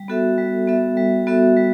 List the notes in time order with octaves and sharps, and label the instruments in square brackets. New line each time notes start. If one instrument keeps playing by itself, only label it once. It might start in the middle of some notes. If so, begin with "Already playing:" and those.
Already playing: [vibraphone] G3
B3 F#4 A4 E5
G3
B3 F#4 A4 E5
G3
B3 F#4 A4 E5
G3